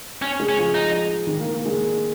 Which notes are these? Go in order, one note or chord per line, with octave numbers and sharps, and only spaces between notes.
C#4
G#3
C#4
F3
D#4
D#3
A#3
A#3
G#3